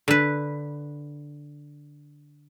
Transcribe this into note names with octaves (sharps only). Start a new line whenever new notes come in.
D3 B4